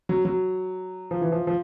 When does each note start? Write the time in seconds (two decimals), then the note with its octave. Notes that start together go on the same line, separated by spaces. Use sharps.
0.09 F#3
0.25 F#3
1.11 F3
1.21 E3
1.32 F3
1.47 F3